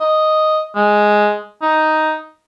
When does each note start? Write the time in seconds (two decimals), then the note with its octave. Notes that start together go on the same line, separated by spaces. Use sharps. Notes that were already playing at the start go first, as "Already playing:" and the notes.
0.01 D#5
0.75 G#3
1.62 D#4